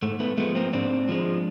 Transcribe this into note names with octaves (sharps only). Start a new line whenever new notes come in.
G#2 A3
A3 B3
F3 G#3 A3 B3
A#3 C4
G#2 C4 D4
F3 G#3